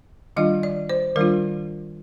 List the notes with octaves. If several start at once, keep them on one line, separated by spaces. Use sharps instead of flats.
D#3 G3 D4 F4 D#5
D5
C5
D#3 G3 D4 F4 A#4